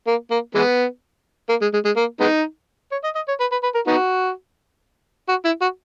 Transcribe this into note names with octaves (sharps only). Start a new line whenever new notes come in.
A#3
A#3
E3 G#3 B3
A#3
G#3
G#3
G#3
A#3
G#3 B3 D#4
C#5
D#5
D#5
C#5
B4
B4
B4
A#4
B3 D#4 F#4
F#4
E4
F#4